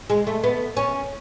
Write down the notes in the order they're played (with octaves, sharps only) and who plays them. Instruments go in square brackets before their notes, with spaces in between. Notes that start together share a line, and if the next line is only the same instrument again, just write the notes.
[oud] G#3
A3
B3
C#4